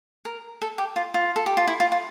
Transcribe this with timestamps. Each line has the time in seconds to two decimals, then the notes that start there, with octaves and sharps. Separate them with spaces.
0.25 A#4
0.62 A4
0.78 G4
0.96 F4
1.14 F4
1.36 A4
1.46 G4
1.57 F4
1.67 E4
1.80 F4
1.92 F4